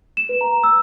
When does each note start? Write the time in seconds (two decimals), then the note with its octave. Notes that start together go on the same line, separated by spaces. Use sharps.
0.17 E7
0.29 B4
0.41 A#5
0.64 E6